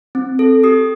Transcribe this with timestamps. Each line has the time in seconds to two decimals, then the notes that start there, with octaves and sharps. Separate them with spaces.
0.15 C4
0.39 A4
0.64 G4 D#6